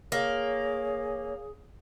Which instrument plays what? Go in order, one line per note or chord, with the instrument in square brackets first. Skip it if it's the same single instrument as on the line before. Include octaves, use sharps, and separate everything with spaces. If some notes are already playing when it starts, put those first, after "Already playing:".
[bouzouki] A#3 [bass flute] G#4 [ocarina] C#5